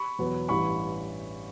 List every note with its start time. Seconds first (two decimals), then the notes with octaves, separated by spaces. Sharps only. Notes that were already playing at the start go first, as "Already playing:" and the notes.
Already playing: B5 C#6
0.19 E2 B2 F#3 B3
0.49 A1 G2 E3 B5 C#6